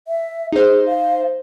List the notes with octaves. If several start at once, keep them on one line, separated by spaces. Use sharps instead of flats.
E5
D#4 G#4 C5
F5